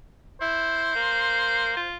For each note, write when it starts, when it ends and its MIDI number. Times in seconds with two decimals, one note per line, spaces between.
0.41 0.92 64
0.41 1.90 72
0.95 1.74 58
1.77 1.97 65